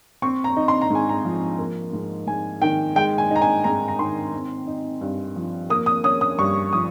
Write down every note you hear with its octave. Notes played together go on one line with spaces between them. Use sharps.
C4 C#6
A#5
D#4
C6
A#5
G#2 G#5
A#5
F3
A#3
G#2
G#2 G#5
D#3 G5
G#3 G5
G#5
D#4 A#5
G#5
G#2 A#5
A#5
D#3 C6
C4
D#4
G2
F3
A#3 D#6
D#6
C#4 D#6
D#6
G2 C#6
F3 D#6